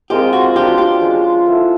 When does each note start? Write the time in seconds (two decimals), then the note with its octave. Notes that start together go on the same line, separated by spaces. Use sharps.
0.10 G#3 C4 F4 G4 A#4
0.33 F#4
0.55 F#3 B3 D4 F4 G4
0.78 G4
1.01 F3 G#3 C#4
1.46 B3 E4 A4